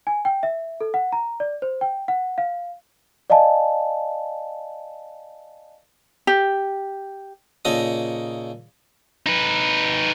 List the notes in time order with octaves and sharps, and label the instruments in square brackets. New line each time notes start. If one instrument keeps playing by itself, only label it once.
[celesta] G#5
G5
E5
A4
F#5
A#5
D5
C5
G5
F#5
F5
D5 D#5 F5 G#5 A5
[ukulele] G4
[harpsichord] A#2 C#3 D#4 A4 A#5 D#6
[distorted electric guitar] D#4 B4